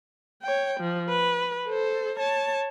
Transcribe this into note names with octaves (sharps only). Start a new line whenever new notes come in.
C#5 G5
F3
B4
A4 C5
C#5 A5